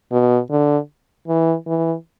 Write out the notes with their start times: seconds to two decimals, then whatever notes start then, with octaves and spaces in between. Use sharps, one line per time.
0.12 B2
0.50 D3
1.28 E3
1.67 E3